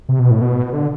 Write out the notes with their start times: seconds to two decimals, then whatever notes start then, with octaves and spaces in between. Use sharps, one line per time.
0.09 C3
0.19 B2
0.31 A2
0.41 B2
0.73 D3